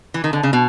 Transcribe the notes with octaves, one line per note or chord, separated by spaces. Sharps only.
E3
D#3
D3
C#3
B2